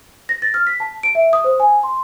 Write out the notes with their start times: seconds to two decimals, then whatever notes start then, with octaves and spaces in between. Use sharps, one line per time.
0.29 A#6
0.42 A6
0.54 F6
0.67 B6
0.80 A5
1.03 D7
1.15 E5
1.33 D#6
1.44 C5
1.60 G#5
1.83 C6